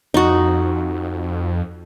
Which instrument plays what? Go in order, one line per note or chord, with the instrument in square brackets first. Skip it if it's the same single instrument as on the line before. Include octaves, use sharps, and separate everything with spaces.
[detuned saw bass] F2 [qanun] D#4 F#4